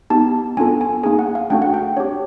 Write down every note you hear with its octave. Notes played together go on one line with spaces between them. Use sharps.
B3 D#4 G4 A5
B3 D4 F4 A4 G#5
G#5
A#3 D#4 G#4 G#5
F#5
F5
A3 D4 F#4 A4 G5
F#5
G5
D4 G4 C#5